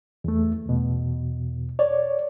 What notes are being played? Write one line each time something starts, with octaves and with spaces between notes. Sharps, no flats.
E2 A3
E2 B2
C#5 D5